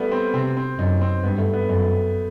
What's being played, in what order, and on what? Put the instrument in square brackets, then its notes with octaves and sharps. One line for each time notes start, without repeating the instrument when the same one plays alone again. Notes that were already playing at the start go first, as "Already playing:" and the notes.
Already playing: [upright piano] G3 A3 B3
C4
[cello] C3 [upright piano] C4
[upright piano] C4
[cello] F#2 [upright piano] D#4
[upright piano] C4
[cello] G2 [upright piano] B3
[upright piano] A3
B3
[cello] F#2 [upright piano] A3